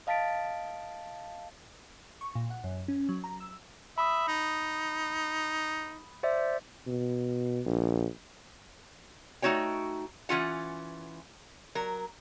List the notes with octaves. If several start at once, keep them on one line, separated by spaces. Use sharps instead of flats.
D#5 F5 A5 A6 B6 D7
C#6
A#2
F#5
F#2
C#4
F#3
A#5
E6
E5 B5 D#6
D#4
C5 D5 E5
B2
A#1
A3 D#4 F#4 C#5 G5
E3 C#4 F4 F#5
F#3 A#4